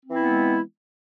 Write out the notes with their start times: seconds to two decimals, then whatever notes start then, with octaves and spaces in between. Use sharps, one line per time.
0.04 C4
0.09 E3
0.14 E4
0.19 B3
0.23 G#3